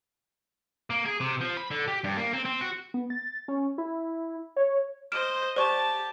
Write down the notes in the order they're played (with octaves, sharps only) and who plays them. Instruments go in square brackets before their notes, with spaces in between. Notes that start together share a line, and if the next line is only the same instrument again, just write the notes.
[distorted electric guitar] A#3
G#4
C3
F3
B5
D3
G4
G2
A#3
C4
C4
F#4
[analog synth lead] B3
A6
C#4
E4
C#5
[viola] C5 D#5 [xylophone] F6 D7 E7
[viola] G4 A5 [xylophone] C5 D5 C#6